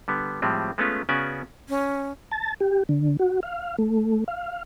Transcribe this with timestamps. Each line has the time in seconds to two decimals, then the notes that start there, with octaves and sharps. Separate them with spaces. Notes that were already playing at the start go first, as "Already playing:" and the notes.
0.08 D3 G3 B3
0.42 A2 F3 G3 G#3 C4
0.78 G#3 A3 B3 C#4 F4
1.09 C#3 B3 C#4 F#4 D5 G#5
1.69 C#4
2.32 A5
2.60 G4
2.89 D3
3.19 F#4
3.43 F5
3.78 A3
4.28 F5